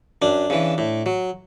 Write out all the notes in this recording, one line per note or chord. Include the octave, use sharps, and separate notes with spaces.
F#2 D4
C#3 E3
A2
F#3